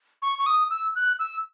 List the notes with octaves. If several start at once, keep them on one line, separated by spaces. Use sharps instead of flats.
C#6
C#6
D#6
E6
F#6
E6